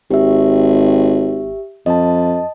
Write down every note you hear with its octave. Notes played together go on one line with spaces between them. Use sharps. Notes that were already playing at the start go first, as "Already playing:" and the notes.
G#1 G4 E5
F2 D#5 A5